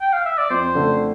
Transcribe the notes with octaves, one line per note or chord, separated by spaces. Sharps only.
G5
F5
E5
D5
F2 C5
D3 A3